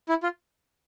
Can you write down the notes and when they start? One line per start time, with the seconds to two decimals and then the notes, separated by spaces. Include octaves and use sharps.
0.09 E4
0.23 F4